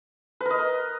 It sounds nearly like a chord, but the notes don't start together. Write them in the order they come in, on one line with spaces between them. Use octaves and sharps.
B4 A#4 D#5